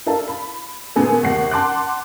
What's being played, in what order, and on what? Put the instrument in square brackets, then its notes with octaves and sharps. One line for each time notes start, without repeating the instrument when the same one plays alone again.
[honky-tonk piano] E4 A4 A#4 D5 F5 A5
B5
A#2 D#3 B3 G#4 A4
D#2 C3 F#5 C7
F#5 A5 C6 D6 F#6